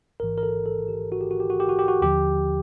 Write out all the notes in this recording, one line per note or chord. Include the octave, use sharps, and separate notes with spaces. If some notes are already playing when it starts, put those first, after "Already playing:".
A1 G#2 E3 A#4
A#4
A4
A4
G4
F#4
G4
F#4
G4
F#4
G4
F#4
G4
F#4
D#2 D3 F3 G4